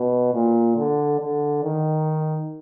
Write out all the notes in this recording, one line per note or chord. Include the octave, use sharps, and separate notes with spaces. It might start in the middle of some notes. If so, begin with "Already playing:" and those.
Already playing: B2
A#2
D3
D3
D#3